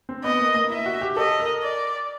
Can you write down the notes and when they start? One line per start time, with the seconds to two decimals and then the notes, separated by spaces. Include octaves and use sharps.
0.09 C4
0.24 B3 D#5
0.40 A#3
0.55 A#3
0.70 E4 E5
0.86 F#4
1.01 G4
1.17 A4 D#5
1.40 A#4
1.63 D5